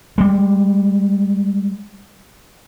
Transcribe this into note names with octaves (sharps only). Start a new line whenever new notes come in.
G3 G#3